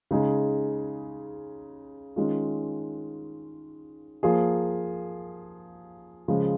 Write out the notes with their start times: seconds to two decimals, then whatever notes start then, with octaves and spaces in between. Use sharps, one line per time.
0.11 C#3 G#3 D#4 G#4
2.16 D#3 G#3 C#4 F4
4.23 F3 A#3 F4 G#4
6.28 C#3 F3 G#3